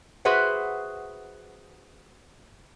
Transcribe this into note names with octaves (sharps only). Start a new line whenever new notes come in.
F#4 G#4 B4 C5 E5 F#5